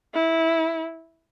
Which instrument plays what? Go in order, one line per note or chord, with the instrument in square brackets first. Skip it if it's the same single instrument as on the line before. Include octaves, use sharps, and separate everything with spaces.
[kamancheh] E4